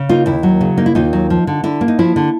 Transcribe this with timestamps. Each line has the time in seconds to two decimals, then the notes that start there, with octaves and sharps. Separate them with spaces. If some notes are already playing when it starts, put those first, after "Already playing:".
Already playing: C#3
0.09 A#3 D#4 F4
0.26 D#2 E4
0.43 F#3
0.61 C#3
0.77 A#3 D#4
0.86 E4
0.95 D#2 D#4 F4
1.13 F#3
1.30 F3
1.47 D3
1.64 D3 E4
1.81 A#3
1.88 D#4
1.99 F3 E4
2.16 D3